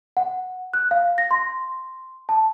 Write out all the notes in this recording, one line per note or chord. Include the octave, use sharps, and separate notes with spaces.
F#5
F#6
F5
A#6
C6
A5